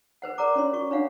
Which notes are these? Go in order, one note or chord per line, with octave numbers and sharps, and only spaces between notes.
B4 C5 F#5
A#4 D5 F#5 A#5 D6
C#4 C#5 C6
F#4 C#6
D4 C#5 F5 F#5